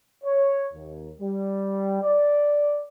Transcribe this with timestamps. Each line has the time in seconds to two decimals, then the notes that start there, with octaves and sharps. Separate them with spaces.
0.24 C#5
0.74 D#2
1.20 G3
2.02 D5